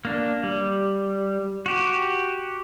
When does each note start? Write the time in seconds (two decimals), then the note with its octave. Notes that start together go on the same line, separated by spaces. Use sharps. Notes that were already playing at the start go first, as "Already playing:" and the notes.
0.05 A#3 D4
0.43 G3
1.66 F#4 G4